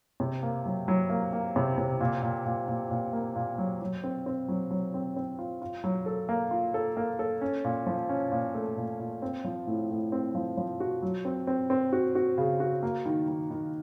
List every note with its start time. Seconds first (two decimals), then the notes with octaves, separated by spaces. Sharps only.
0.20 C3
0.43 A#3
0.65 F#3
0.88 F#3
1.10 A#3
1.33 A#3
1.56 C3
1.78 C3
2.01 A#2
2.23 A#2
2.46 A#2
2.68 A#2
2.91 A#2
3.13 A#3
3.36 A#2
3.58 F#3
3.81 F#3
4.04 C4
4.26 C4
4.48 F#3
4.71 F#3
4.94 C4
5.16 C4
5.39 F4
5.62 F4
5.84 F#3
6.06 A4
6.29 A#3
6.51 F4
6.74 A4
6.97 A#3
7.19 A4
7.41 C#4
7.65 A#2
7.87 F3
8.09 C#4
8.32 A#2
8.55 A3
8.77 A#2
8.99 A#2
9.22 C4
9.44 F3
9.67 A2
9.90 A2
10.12 C4
10.35 F3
10.57 F3
10.80 F#4
11.02 F#3
11.25 C4
11.47 C4
11.70 C4
11.93 F#4
12.15 F#4
12.38 C#3
12.60 F#4
12.83 A#3
13.05 D#3
13.28 D#3
13.50 D#3